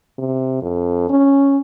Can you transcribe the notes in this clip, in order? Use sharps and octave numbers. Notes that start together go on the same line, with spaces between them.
C3
F2
C#4